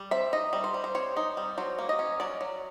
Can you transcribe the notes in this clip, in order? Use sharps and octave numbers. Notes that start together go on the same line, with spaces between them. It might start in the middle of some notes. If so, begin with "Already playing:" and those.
Already playing: G3
C4 E5
D#4 D#5
G3
C5
G3
C5
C4 C#5
D#4
G3
F#3 C5
A#3
D#5
C#4
F#3 D5
F#3